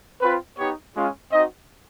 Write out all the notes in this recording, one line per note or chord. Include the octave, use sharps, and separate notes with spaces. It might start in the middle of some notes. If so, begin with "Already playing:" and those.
C4 F4 B4
B3 D#4 G4 C#5
G#3 C#4 F4
C4 D#4 F#4 D#5